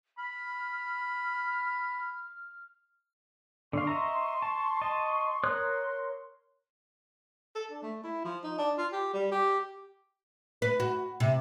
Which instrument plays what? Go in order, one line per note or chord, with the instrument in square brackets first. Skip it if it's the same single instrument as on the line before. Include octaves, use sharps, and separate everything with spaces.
[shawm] B5 [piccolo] F6
[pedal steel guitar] D3 D4 F5 [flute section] C6 C#6
[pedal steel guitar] D#5 E5 A#5
A5
D#5 A5
[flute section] A#4 C6 [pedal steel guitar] C#5 D#6 F#6
[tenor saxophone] A4
D4
A3
E4
F3
D#4
D4
F4
G4
G3
G4
[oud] B4
F#4
C3